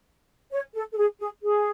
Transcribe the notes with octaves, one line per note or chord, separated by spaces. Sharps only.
C#5
A4
A4
G#4
G#4
G#4